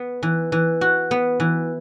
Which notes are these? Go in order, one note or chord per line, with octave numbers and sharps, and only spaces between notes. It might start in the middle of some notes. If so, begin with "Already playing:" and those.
Already playing: B3
E3
E3
F#4
B3
E3